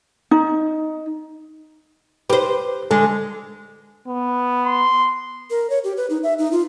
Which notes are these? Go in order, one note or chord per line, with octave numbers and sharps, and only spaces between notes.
D#4
G4 B4 C5
D3 G#3 A4
B3
C6
A#4
C#5
G4
B4
D#4
E5
D#4
F4